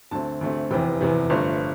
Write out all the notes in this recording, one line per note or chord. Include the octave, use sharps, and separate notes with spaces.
D2 D3 A3 C4 A5
D2 D3 A3 C4
F1 E2 C3 E3 G5
F1 E2 C3 E3
G1 G2 F3 A3 C5